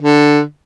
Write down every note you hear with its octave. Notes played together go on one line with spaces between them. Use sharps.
D3